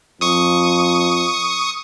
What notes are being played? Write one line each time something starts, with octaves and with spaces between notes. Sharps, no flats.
F2 C#6 D#6